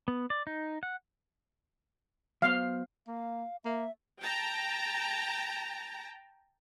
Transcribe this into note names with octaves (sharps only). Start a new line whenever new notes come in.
B3
D5
D#4
F#5
F#3 B3 C5 F5
A#3 F5
A#3 E5
G5 A5 A#5